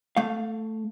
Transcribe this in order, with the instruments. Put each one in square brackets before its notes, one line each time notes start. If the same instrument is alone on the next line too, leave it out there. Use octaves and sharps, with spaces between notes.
[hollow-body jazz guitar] A3 F5